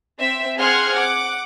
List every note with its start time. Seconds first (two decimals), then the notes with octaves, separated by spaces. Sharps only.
0.19 C4 E5
0.58 C4 G#4 F#5 C6 F6 G#6
0.93 F#5 D6